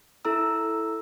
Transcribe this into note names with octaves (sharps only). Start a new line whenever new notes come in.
E4 A4 A#5 E6